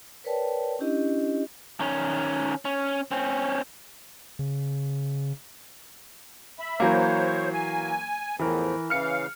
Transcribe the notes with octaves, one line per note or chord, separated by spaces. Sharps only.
A#4 B4 C#5 D5 G5 A5
C#4 D4 E4 G4 D#5
D#3 C#4
C#4
C4 C#4
C#3
E5 B5
E3 F#3 A#3 C5 C#5
G#5
E2 A2 E3 F3 A#4
C#3 E3 F5 F6 C#7